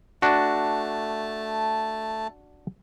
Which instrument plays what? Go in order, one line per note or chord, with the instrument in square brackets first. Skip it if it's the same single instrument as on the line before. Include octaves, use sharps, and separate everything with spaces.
[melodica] A3 A5 [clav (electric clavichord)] D4 F#4